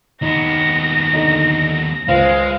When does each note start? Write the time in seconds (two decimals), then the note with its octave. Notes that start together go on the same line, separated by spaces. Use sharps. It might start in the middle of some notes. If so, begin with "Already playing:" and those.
0.22 D#2 B3 D#4 A#6
1.13 D3 D#4
2.08 C#2 G#3 C5 F5